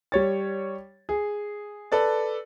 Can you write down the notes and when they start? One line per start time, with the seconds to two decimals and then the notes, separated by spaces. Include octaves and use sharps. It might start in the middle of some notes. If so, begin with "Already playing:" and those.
0.12 G3 C#5 A6
1.09 G#4
1.92 A4 B4 D5